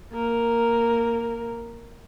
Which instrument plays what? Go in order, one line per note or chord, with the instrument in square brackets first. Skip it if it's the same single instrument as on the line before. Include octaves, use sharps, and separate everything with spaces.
[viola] A#3 A#4